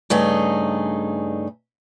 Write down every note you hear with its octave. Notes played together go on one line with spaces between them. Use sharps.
G2 C#3 A3 D#4 G#4